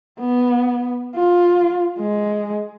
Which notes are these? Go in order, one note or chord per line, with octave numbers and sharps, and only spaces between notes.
B3
F4
G#3